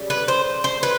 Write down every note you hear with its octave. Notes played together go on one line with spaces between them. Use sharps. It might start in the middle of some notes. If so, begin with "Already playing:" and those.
Already playing: C#3 G3
B4
C5
C5
B4